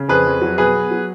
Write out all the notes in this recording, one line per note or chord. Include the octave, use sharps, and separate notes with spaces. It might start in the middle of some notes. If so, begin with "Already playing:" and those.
Already playing: C#3
F2 G#4 B4
F2
F#3
B2 G#4 B4
B3
F#3